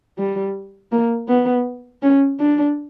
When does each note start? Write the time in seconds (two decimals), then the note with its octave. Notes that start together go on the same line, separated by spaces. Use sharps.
0.18 G3
0.92 A#3
1.28 B3
2.02 C#4
2.39 D4